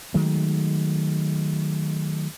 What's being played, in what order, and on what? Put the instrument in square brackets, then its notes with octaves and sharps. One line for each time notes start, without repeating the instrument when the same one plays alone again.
[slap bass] D#3 F#3 G#3 A3